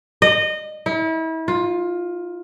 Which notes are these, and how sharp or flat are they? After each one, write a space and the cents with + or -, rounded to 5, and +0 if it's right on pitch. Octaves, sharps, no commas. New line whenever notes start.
D#5 -20
E4 -35
F4 +15